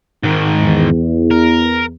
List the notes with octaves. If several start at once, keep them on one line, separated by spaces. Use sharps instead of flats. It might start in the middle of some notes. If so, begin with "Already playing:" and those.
G#2 D#3
E2
A#4